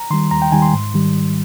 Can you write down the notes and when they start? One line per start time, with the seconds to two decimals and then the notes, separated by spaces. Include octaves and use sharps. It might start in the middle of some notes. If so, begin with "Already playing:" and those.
Already playing: A#5
0.10 D#3 G3 C6
0.31 D#2 A#5
0.42 G5
0.52 D#3 G3 G#5
0.62 C6
0.73 G#2
0.94 D#3 G3